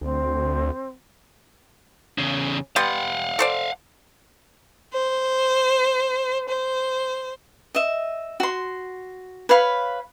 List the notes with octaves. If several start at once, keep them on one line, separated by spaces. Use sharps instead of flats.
D2 C4
E2 C#3
G3 B3 F5 F#5 C6
A4 C5 D5
C5
C5
D#5 E5
F#4 C6
B4 C#5 F5 B5